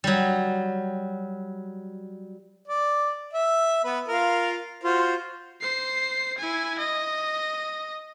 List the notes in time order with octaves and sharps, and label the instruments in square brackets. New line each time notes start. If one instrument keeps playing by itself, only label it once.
[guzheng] F#3 G3
[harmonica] D5
E5
B3 B4
F4 A#4 F5
F4 F#4 C5
[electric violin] C5 C7
E4 G#5
D#5